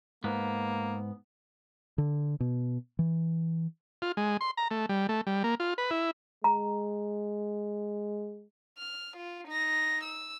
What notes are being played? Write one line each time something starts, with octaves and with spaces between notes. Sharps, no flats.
G#2 A#3 B3
D3
B2
E3
F4
G#3
C6
A#5
A3
G3
A3
G3
A#3
F4
B4
E4
G#3 A#5
F6
F4
D#4 A#6
E6